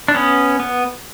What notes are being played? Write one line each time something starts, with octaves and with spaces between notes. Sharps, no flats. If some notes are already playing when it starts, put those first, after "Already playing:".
D4
B3 C#4
B3